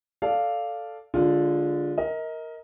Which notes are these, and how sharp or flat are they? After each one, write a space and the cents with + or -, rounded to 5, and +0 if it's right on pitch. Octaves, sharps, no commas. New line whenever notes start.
A4 +0 D5 +0 F5 +0
D3 -10 G#3 -20 F4 +10
A#4 +0 D#5 +30